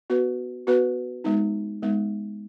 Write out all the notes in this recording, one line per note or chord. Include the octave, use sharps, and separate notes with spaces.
B3 F#4 B4
B3 F#4 B4
G#3 B3 D#4
G#3 B3 D#4